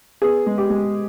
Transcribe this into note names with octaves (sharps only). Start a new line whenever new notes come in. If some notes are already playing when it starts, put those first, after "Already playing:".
B3 G#4
G#3
G4
G#3